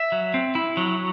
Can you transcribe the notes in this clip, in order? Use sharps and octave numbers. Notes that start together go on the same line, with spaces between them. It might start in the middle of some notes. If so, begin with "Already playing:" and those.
Already playing: E5
F#3
C4
E4
F#3